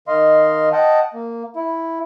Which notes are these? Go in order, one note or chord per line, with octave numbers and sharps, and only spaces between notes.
D#3 D#5 F5 C6
D#5 F#5 G5 A5
A#3
E4